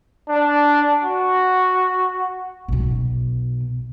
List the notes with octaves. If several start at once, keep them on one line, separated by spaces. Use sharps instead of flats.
D4
F#4
B1 B2